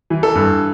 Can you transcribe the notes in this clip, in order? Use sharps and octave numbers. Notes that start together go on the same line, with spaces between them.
E3
A4
G2